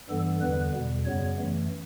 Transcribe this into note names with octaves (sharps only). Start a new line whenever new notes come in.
G2 E3 G3 B3 A4
E2 D3 G3 B3 B4
E2 B2 G3
F#2 C#3 G3 B3 C#5
F#2 E3 A3